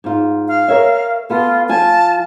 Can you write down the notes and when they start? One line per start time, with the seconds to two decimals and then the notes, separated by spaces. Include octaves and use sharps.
0.04 G#2 F4
0.48 F5
0.68 A#4 C#5 E5
1.30 B3 F4 A4
1.69 F3 F4 G#5 A5